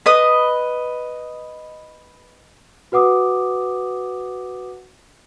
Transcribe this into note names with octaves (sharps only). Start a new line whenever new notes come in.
B4 D#5 D#6
F#4 B4 F#5 D6 D#6